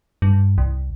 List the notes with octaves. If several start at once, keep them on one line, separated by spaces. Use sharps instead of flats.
G2
C2